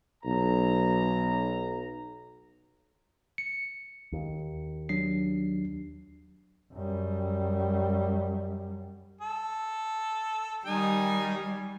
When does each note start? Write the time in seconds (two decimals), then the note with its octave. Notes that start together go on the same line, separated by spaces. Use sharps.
0.24 B1 A#5
3.38 C#7
4.12 D#2
4.89 F#3 D4 C7
6.74 F#2 G3
9.21 A4
10.66 D#3 G3 D#4 G#5